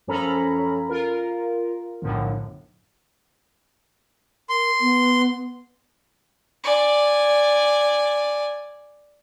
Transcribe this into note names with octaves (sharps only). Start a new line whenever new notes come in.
F#2 F3 C#4 A4 A#5 B5
F4 A#4
B1 F#2 A2 D3 F3
A#4 C6
B3
D5 G#5